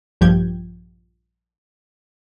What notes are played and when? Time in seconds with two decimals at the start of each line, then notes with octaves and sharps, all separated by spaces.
0.21 A#1 G2 F3 G4 G6 G#6